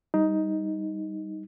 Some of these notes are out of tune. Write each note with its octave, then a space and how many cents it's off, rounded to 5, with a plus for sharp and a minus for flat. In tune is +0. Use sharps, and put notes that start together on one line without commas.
G3 +0 D#4 +10